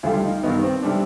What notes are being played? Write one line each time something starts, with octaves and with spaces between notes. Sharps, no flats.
D2 D3 G3 F4
D#4
G2 D#3 B3 D#4
C4
C3 G3 D4